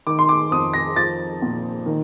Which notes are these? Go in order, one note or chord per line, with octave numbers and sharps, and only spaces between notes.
D#3 D6
C6
D6
F2 D#6
A#6
F3 A6
A#2
D#3